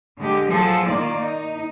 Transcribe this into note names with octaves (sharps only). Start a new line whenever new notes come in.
D3 G#3 G4
F3 F#3 G#4 A4
D#3 A#3 F4 D5
D#4